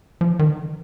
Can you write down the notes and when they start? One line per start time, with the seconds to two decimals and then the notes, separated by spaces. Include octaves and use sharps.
0.21 F3
0.31 E3
0.39 D#3
0.48 D3
0.67 E3